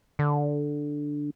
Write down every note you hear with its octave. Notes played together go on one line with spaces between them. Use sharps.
D3